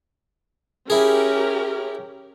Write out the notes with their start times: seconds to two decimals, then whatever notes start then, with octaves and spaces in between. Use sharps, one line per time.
0.90 C#4 E4 G4 G#4 A#4